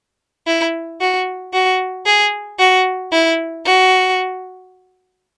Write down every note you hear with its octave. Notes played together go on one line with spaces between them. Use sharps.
E4
F#4
F#4
G#4
F#4
E4
F#4